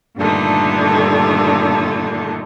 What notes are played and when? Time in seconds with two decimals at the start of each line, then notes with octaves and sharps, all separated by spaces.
0.17 G2 A#2 D3 D#3 A3